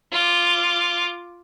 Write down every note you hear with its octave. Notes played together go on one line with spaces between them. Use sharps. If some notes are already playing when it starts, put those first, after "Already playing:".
F4 D6